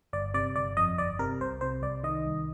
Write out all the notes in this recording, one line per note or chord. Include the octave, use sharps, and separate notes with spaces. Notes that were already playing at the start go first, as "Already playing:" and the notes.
G1 D5
C3 D5
G1 D5
F2 D#5
G1 D5
C3 A#4
C2 C5
C3 C5
C2 D5
D#3 D#5
C2